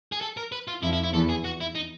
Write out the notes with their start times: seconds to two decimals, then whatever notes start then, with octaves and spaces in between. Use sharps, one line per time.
0.12 G#4
0.21 A4
0.37 A#4
0.52 B4
0.68 F4
0.82 F2 F3 E4
0.93 E4
1.04 E4
1.14 E2 E3 A4
1.29 G#4
1.44 F#4
1.61 E4
1.75 D#4